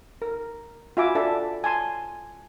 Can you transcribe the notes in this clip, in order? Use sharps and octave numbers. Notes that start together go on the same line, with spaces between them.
A#4
F4 F#4 E5 G#5 B5 D6
D4 A4 D5 E5 A5
G#5 A5 C6